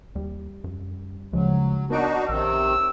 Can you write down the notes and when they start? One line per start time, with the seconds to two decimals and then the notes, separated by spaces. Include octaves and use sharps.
0.15 D#2 G3
0.64 F#2
1.33 D2 C#3 F3 F#3 G#3
1.90 B3 D4 D#4 F#4 A#4 C#5 D7
2.29 A#1 C3 D#3 E6